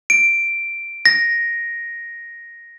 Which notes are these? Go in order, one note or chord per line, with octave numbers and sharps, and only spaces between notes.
D7
A#6